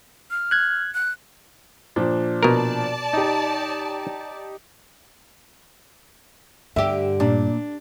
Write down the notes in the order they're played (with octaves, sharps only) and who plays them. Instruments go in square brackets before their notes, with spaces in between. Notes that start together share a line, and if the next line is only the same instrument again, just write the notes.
[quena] F6
[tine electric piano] F#6 G#6
[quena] F#6
[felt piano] A#2 F3 D4
[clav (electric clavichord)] B2 A#4 [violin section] D5 A5
[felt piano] D#4 G4
[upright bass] G2 [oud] D3 G4 [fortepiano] E5
[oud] A#2 [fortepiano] D4